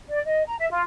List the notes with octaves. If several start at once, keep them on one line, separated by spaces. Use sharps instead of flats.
D5
D#5
A#5
E5
F4